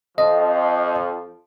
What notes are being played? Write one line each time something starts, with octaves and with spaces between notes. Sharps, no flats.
F2 F3 D#5